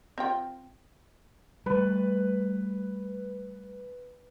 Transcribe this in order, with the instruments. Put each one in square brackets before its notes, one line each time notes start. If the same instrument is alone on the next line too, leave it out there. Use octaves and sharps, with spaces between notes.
[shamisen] C4 F4 G5
[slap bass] G3 A3 [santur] B4